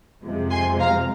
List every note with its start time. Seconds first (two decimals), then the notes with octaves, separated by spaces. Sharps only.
0.22 F2 C3 F3 G#3
0.51 G#5 C6
0.79 F5 A#5